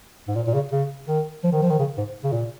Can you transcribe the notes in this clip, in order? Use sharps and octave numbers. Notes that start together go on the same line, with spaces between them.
G#2
A#2
A#2
C#3
C#3
D#3
F3
D#3
F3
D#3
C#3
G#2
C#3
A#2